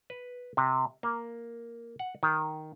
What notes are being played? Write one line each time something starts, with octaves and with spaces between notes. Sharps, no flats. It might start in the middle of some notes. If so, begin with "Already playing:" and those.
B4
C3
A#3
F#5
D#3